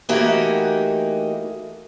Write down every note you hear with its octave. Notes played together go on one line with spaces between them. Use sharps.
E3 A3 A#3 D#4 F#4 G4